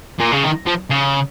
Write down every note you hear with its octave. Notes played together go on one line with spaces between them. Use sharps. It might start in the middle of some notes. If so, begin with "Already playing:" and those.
A#2
C#3
D#3
F3
C#3